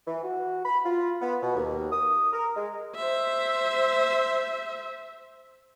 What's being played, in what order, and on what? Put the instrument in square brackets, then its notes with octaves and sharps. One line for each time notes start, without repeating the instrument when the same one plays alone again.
[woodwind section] E3
F#4
B5
F4
B3
B2
D#2
D#6
A#4
G#3
[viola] C5 E5